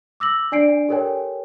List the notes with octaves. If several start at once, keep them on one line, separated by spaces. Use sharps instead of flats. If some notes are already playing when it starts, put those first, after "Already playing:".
D6 E6 A#6 F#7
D4 D5 G#5 C7 D7
G4 A4 A#4 C#5 G5 G#5